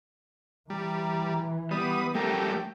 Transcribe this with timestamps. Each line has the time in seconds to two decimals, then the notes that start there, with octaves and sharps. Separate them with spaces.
0.70 E3 G3 A#5
1.71 G3 B3 B4 D#6
2.15 F2 G3 A3 G4 A#4 G5